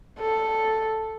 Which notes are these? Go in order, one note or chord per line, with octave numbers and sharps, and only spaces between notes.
A4